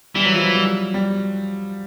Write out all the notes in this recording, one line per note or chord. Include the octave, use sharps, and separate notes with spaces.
E3 G3
F#3
F3
F#3
G3
G3